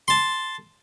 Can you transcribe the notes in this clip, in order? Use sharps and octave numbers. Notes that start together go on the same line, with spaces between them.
A5 C6